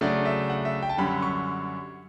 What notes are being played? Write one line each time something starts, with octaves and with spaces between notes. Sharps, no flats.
C#3 F#3 A3 D4 D5
E5
F#5
E5
G5
A5
F#2 D3 G3 C#4 B5
C#6